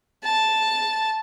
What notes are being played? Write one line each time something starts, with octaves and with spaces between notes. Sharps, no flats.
A5